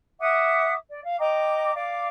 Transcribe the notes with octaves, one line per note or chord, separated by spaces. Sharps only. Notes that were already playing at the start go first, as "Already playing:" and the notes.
E5 F#5 D6 D#6
D5
F5
D#5 G5 A#5 D6
D5 F5 D6